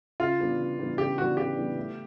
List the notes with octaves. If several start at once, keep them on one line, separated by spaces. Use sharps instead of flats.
C#3 F4
E3 G3 B3 D4
C#3
E3 G3 B3 D4
C#3 G4
E3 G3 B3 D4 F#4
C#3 G4
E3 G3 B3 D4
A3